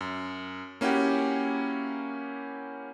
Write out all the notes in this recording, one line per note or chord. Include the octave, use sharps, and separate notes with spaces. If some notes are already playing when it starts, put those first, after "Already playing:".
F#2
A#3 C#4 E4 F#4 G4